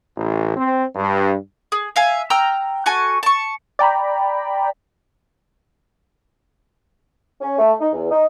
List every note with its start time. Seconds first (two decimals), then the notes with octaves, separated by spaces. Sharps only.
0.16 A1
0.56 C4
0.95 G2
1.72 G#4
1.96 E5 F5 G#5
2.30 G5 A#5 E6 F6
2.86 F#4 A4 G#5 C#6
3.23 A5 C#6
3.79 D5 G5 A#5 B5
7.41 C#4
7.59 A3
7.80 D#4
7.93 E2
8.11 D#4